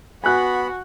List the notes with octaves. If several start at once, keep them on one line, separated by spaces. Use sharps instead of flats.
B3 F#4 G#5 B5 F#6